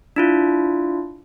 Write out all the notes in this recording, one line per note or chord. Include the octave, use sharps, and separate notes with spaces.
D4 E4 F4